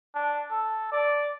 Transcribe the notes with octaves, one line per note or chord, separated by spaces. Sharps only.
D4
A4
D5